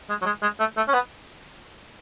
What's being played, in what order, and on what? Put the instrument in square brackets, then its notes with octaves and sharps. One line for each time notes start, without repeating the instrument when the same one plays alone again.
[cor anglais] G#3
F#3
G#3
G#3
A3
A3
C#4
B3